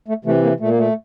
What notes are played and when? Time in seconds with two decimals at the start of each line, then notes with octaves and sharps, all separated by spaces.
0.08 A3
0.25 C3 E3 A3
0.43 A#3
0.60 A#2 A3
0.69 A#3
0.78 A3